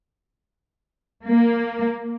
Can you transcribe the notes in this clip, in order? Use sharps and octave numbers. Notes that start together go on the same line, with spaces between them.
A#3